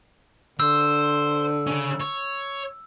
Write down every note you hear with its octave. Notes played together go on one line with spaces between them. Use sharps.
D3 C5 E6
C#3 C#4
C#5